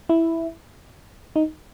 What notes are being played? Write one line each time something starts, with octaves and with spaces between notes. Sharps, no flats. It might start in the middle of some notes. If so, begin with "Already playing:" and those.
E4
D#4